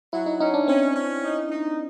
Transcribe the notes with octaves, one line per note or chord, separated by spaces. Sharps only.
F#3 E4
D#4
C#4 D#4
D4
C4 C#4
C#4
D#4
D#4